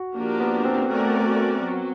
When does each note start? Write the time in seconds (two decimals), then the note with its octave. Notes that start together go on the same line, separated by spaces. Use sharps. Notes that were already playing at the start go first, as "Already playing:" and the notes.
Already playing: F#4
0.16 F3 A#3 D4 G4 A#4
0.40 B3
0.65 C4
0.90 A3 C#4 F#4 A#4 D5
1.64 F#3